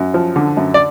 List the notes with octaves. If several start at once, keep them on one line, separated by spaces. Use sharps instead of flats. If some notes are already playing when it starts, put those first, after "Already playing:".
Already playing: F#2
F3
D3
F#2
D5